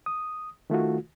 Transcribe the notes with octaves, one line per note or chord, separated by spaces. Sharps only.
D#6
D#3 A3 F4 F#4